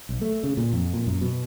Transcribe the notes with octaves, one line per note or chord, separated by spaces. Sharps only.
B1
A3
C#3
A#2
F2
A#2
F#2
B2